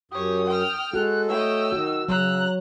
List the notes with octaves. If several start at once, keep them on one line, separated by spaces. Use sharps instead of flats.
F#2 G4 C#5 D#6
G5 F6
G#3 F#4 A4 F#6
A3 C#5 D#5 G5 E6
D#3 F#4
C#3 F#3 A#5 E6 F#6